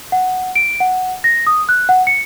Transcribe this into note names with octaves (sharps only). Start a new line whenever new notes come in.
F#5
D7
F#5
A#6
D#6
F#6
F#5
C#7